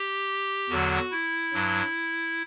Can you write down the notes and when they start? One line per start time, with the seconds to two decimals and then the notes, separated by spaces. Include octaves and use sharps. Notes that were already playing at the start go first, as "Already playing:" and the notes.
Already playing: G4
0.69 E2 D3 F#3 F#4
1.11 E4
1.53 G2 F#3